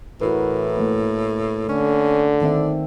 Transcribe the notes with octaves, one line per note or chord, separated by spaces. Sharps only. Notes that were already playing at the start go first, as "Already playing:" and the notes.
A2 E3 F#4 A#4 B4
A3 A#3
D3 A3 C#4
D#3 C4 D4 E5